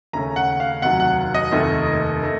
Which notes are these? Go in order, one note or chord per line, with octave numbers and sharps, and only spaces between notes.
D#2 C#3 A3 C#4 A#5
F#5
F5
F1 D#2 D#3 F#3 F#5
F#5
D#5
F1 D#2 D#3 A3
D#3 A3